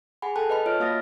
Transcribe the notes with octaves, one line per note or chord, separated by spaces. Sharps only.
G#4 F#5 G#5 B5
A4 G5 A5 B5 F#6
B4 D#5 A5 B5
F4 C#5 D#5 F6 D7
A#3 F#4 F5 D#6 A6 A#6